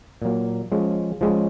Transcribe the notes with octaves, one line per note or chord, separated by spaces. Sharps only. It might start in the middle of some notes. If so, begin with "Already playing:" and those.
A#2 F#3 A#3
F3 G#3 C#4
F3 G#3 C#4